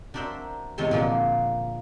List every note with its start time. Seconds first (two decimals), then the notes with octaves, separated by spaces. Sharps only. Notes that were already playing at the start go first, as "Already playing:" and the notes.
0.14 D4 F#4 A#4 C5 E5
0.78 E2 C3 G#3 A4 C#5 C6
0.91 A#2 D3 F3 A#3 D4